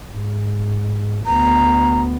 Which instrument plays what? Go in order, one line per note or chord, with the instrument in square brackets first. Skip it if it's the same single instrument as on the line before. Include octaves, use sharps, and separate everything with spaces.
[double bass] G#2
[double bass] D2 B3 [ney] A#5